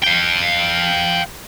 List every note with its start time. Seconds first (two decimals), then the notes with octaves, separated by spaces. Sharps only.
0.04 F5 G5